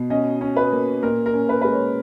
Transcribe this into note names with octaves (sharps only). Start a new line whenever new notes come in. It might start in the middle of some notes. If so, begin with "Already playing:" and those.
Already playing: B2
C#4 D#5
C#4
B4
A#3
A#2 A#4
A#4
C#4
B4
G#3 B4
C#5